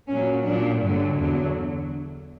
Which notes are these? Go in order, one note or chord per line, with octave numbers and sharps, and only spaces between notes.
A#2 F#3 C#4
A#2 F#3 D4
G2 D3 F#3
E2 D3 F#3